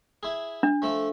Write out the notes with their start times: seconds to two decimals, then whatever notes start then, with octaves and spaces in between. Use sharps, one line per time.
0.23 E4 G#4
0.63 D4
0.82 F3 A3 A4